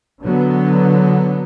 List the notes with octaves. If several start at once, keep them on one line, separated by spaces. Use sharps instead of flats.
D3 F#3 B3